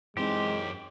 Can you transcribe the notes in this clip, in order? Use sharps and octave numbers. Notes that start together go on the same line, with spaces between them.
F#2 E3 G#3 C4 D#4 G4 C6